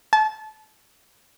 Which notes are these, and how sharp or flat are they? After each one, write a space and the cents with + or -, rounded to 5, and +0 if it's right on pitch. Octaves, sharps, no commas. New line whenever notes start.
A5 -25